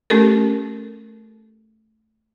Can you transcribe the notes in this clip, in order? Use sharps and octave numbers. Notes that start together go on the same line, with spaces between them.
A3 C#4 G4 A4 A#4